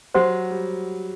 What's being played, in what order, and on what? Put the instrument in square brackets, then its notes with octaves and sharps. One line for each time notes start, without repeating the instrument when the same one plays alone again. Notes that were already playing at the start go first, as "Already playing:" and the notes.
[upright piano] F#3 [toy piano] G4 C5 F#5 C6
[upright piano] G3